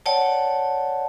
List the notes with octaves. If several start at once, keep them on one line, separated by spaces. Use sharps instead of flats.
C#5 D5 F#5 G5 A5